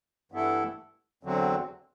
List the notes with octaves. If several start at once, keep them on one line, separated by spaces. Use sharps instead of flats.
G2 E3 B3 E4 A4
E2 D3 F#3 C4